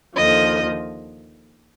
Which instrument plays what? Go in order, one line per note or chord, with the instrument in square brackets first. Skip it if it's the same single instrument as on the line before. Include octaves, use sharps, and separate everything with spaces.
[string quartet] D#2 D3 F3 D#5